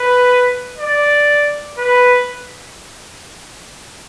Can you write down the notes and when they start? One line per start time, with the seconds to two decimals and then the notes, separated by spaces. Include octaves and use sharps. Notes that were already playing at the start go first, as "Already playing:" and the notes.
Already playing: B4
0.77 D5
1.78 B4